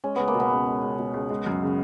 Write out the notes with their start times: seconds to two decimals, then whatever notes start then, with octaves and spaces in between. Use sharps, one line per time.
0.04 G#3 C#4
0.16 C#2 B3
0.28 A#3
0.35 B2 B3
0.51 C#2
0.67 G#3
0.82 C#2
0.99 B2
1.14 C#2
1.30 G#3
1.46 F#2
1.62 C#3